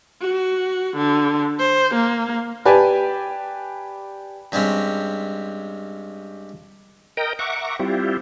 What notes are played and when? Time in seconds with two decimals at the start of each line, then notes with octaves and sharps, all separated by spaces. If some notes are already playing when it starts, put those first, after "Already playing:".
0.21 F#4
0.97 D3
1.59 C5
1.94 A#3
2.65 G4 B4 D5 G#5 A5
4.52 G2 G3 G#3 C4 C#4
7.17 A#4 D#5 G5 A#5
7.39 E5 F#5 A#5 C#6 D6
7.80 G3 C4 E4 F4 G4